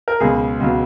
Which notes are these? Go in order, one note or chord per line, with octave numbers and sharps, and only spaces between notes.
A#4
C#2 B2 F#3 G#4
C#2 B2 F#3